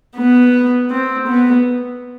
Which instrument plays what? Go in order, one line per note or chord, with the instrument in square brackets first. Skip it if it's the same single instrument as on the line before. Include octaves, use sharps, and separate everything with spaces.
[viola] B3
C4
B3